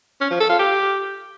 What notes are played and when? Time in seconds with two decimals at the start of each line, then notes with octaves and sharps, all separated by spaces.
0.21 C#4
0.30 F3
0.40 A4
0.49 F4
0.59 G4